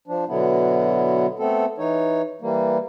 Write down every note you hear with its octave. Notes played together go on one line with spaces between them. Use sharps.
F3 D4
B2 D3 F#3 B3 E4
A3 B3 C4 A4
E3 D#4 C#5
E3 G3 A#3